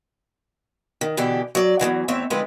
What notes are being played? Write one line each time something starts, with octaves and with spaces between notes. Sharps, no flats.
D#3
B2 D3 E3 D4 G4
F#3 D5
E2 B2 E3 F#3
E2 A2 C4 C#5 E5
D3 F3 G#3 C4 D#4 B4